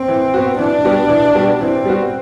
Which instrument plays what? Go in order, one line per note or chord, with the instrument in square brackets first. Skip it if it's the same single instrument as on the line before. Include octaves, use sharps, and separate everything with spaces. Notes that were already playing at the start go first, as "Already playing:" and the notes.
Already playing: [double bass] C4
[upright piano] E3
B3 F#4
[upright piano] E3 [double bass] D4
[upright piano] G3 B3 F#4
E3
G3 B3 F#4
[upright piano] E3 [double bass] C4
[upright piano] G3 B3 F#4